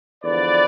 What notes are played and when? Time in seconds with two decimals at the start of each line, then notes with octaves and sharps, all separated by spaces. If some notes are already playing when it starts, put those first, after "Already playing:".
0.23 E2 D3 F3 B4 D5